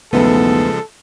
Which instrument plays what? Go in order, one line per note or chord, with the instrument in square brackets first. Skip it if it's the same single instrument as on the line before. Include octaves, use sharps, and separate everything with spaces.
[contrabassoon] B1 [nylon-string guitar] E2 A3 B3 [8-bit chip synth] C#3 F3 G#3 [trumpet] A4